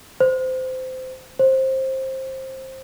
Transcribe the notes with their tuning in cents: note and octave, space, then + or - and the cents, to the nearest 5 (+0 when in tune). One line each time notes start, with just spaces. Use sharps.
C5 -20
C5 +20